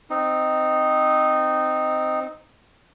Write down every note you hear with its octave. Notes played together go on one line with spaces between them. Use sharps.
C4 D#4